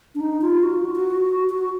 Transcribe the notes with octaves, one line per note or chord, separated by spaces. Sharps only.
D4
D#4
F4
F#4
F4
F#4
F#4
F#4